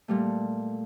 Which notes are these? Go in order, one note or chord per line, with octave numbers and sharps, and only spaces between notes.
A#2 G3 A3